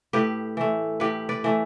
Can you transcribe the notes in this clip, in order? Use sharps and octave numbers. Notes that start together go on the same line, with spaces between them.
A2 G4 B4
E3 A3
A2 G4 B4
B4 D5
E3 A3